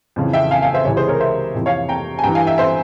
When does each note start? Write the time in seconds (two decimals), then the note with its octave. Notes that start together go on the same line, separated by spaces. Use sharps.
0.16 F2 C#3 E3
0.33 E5 G5
0.51 F5 G#5
0.62 F5 G#5
0.74 C5 E5
0.85 C#2 C3 E3 C#5
0.96 G#4 C5
1.08 A#4 C#5
1.20 C5 E5
1.55 F2 C3 E3
1.66 C#5 F5
1.89 G5 A#5
2.19 G#5
2.24 G2 E3 G5 A#5
2.35 F5 G#5
2.47 E5 G5
2.58 C5 E5